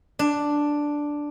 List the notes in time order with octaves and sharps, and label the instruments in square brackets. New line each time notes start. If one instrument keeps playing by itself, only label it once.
[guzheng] D4